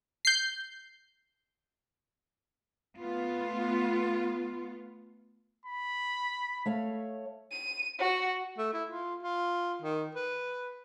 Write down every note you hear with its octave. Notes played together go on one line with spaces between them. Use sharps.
G6 C7
A3 B3 F4
B5
A3 C#5 F5
D#7
F#4
A3
E4
F4
F4
D#3
B4